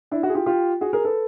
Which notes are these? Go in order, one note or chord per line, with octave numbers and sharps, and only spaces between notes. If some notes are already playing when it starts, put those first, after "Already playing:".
D4 E4
E4 F#4
G#4
F4 G4
F4 G4
F#4 G#4
G#4 A#4
A4 B4